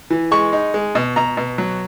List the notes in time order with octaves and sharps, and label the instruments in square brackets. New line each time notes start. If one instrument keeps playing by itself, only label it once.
[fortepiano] E3
G#3 C#6
D#4
G#3
B2
B2 A#5
B2
F#3